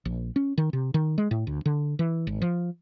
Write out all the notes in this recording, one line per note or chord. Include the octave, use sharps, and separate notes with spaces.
A#1
C#4
D#3
C3
D#3
G#3
A2
D2
D3
E3
G#1
F3